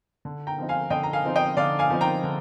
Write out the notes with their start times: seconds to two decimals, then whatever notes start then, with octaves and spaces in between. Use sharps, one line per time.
0.25 D3
0.47 G5 A#5
0.58 F3 C4 D#4
0.69 F5 G#5
0.90 D3 D#5 G5
1.03 A#5
1.13 F5 G#5
1.24 F3 C4 D#4
1.36 D#5 G5
1.57 D3 D5 F5
1.79 F5 G#5
1.90 F3 C4 D#4
2.01 G5 A#5
2.24 D3